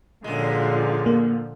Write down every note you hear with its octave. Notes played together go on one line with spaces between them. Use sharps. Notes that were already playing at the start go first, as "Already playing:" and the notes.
F#2 A#2 D3 F3 G#3
A#3